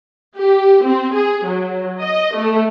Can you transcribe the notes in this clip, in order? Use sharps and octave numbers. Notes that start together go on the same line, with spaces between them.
G4
C4
G#4
F#3
D#5
A3